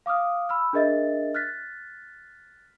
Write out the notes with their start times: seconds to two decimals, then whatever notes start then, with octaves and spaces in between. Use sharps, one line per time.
0.06 F5 D6 D#6 F6
0.49 B5 E6 F6
0.73 D4 G#4 A#4 D#5 E5 A6
1.34 F6 F#6 A6 B6